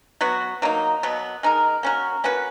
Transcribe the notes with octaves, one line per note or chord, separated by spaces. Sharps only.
F#3 B3 F#4
F#3 A#3 D#4
B2 F#3 B3
G#3 D#4 A#4
A#3 C#4 F#4 A#4
A#3 C#4 F#4 B4